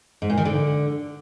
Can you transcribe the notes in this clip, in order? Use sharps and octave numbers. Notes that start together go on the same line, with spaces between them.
G#2
A#2
D#3
D3